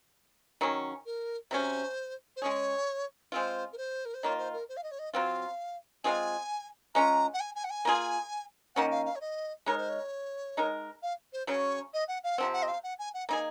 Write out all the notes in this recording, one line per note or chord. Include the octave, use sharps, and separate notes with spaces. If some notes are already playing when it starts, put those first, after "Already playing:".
D#3 F#3 C#4
A#4
C3 F#3 C#4 C5
C5
G#3 C#4 G#4 C#5
G#3 C4 F4 C5
A#4
C5
A#4
C5
D#3 A#3 F4 C#5
C5
A#4
C5
F5
D#5
C#5
D#5
F#3 C4 F4 F5
G#3 C4 F4 G#4 G#5
G#3 C#4 F4 A#5
F#5
G#5
G#5
F#5
G#5
A#3 F4 G#4
D#3 A#3 C#4 F#5
F5
F5
C#5
D#5
G#3 D#4 A#4 C#5
C5
C#5
G#3 D#4 A#4
F5
C5
C#3 F#3 C#4 C#5
D#5
F#5
F5
C3 F3 C4 F#5
F#5
D#5
F5
F#5
G#5
F#5
A#3 D#4 G#4 G#5